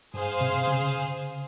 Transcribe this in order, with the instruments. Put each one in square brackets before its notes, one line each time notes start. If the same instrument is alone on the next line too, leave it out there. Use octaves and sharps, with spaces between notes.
[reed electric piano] G2 [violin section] G#4 C5 F5
[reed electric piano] C3
C#3